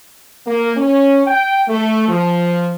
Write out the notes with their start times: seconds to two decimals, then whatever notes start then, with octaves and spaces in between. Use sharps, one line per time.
0.46 A#3
0.76 C#4
1.27 G5
1.68 A3
2.08 F3